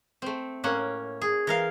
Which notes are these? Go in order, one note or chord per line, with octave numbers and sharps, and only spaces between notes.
A3 C4
A2 A#3 C#4 F#5
G#4
E3 A#4 F5